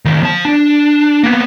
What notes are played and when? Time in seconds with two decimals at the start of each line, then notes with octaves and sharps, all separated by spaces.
0.05 A2 D#3
0.23 F3 A5
0.45 D4
1.23 A#3 B3